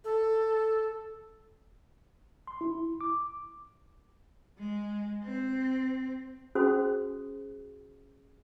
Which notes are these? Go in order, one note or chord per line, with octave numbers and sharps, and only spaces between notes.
A4
C6
E4
D6
G#3
C4
C#4 F#4 G#4 C5 D#6